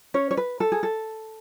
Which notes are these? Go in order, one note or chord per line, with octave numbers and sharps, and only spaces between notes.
C#4 C#5
C#5
B4
A4
G#4
A4